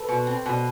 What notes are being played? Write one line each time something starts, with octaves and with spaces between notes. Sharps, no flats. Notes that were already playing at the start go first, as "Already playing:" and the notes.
Already playing: A4 B4 C5
B2
C4
B2